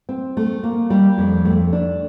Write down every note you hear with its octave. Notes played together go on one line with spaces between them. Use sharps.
C4
A3
A#3
G3
F2
A3
D4